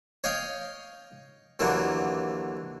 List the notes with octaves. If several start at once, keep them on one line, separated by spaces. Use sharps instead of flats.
C#5 D#5 F5 G5
D#2 D3 E3 F#3 A#3